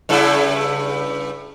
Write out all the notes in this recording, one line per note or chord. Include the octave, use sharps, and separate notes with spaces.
G2 C#3 E4